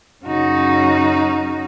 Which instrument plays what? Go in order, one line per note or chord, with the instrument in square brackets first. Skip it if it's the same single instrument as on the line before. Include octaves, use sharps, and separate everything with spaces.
[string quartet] F#2 C#3 C#4 D#4 F#4